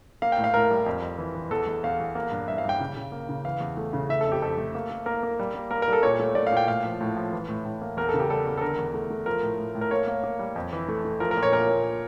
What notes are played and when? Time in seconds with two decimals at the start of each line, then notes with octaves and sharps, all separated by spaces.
0.22 A#3 F5
0.32 G5
0.38 A2
0.44 F5
0.54 A2 A#4
0.71 G3
0.86 F2
1.02 F2
1.18 E3
1.35 E3
1.51 E2 A4
1.67 E2
1.83 E2 F5
2.00 E2
2.15 A#3
2.31 G2
2.48 G2 E5
2.58 F5
2.65 G2 G5
2.80 C#3
2.97 C#3
3.12 A#3
3.29 C#3
3.45 E3 F5
3.60 E2
3.77 A3
3.93 C#3
4.09 A3 E5
4.21 A4
4.26 F2
4.32 G4
4.42 F2 A4
4.57 A3
4.75 A#3
4.91 A#3
5.06 A#3 A#4
5.23 A#3
5.39 G3
5.55 A#3
5.71 A#3 A#4
5.82 A#4
5.88 G3 A4
6.03 A#2 C#5
6.20 A3
6.35 A3 D5
6.47 A#2 F5
6.57 G5
6.67 A2 F5
6.84 F3
7.01 A2
7.16 F3
7.32 E3
7.49 A2
7.65 A2
7.82 A#3
7.97 E2 A#4
8.09 A4
8.14 C#3
8.20 G4
8.30 G3 A4
8.46 E2
8.57 A4
8.61 D3 A#4
8.78 E2
8.94 A3
9.10 A3
9.26 F3 A#4
9.43 A2
9.58 A2
9.75 A2
9.81 A#4
9.91 A#3 C#5
10.08 A#3
10.24 A#3
10.39 G3
10.56 F2
10.73 E3
10.89 A3
11.05 A3
11.20 F3 A#4
11.31 A#4
11.37 A#2
11.43 C#5
11.52 A#2 A#4
11.69 A#2